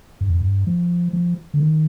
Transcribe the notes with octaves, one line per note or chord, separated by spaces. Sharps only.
G2
F2
G2
F3
F3
D3
D#3